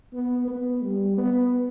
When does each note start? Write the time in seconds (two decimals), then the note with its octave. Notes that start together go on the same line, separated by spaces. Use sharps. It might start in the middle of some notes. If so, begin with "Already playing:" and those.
0.13 B3
0.48 B3
0.82 G3
1.17 B3